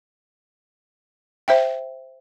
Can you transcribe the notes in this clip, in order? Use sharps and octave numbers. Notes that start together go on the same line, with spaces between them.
C5 E5 G5